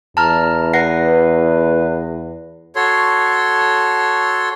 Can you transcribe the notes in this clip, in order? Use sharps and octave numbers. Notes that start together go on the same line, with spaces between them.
E2 A5 A#5 F6
B4 F#5 A#6 C7
F#4 A4 C#5 C6